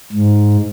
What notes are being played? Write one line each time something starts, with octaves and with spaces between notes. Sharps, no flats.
G#2